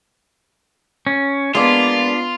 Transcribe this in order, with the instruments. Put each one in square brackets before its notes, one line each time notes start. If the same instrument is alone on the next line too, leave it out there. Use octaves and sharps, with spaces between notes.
[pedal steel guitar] C#4
[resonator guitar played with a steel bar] G#3 A#3 D5 [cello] B3 [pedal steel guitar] D4 [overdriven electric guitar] F4